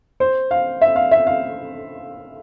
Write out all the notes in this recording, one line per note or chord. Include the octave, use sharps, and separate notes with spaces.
C5
F5
E5
F5
E5
F5